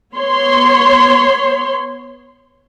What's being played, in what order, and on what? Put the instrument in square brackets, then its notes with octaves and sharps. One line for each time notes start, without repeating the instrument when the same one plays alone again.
[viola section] B3 C#5 C6